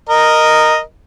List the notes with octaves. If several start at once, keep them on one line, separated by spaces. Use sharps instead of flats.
A#4 D#5